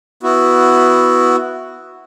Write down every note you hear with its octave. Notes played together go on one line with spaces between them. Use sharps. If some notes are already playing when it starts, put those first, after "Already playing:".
B3 E4 F#4